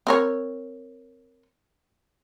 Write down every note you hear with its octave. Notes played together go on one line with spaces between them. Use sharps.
C4 A#4 C#5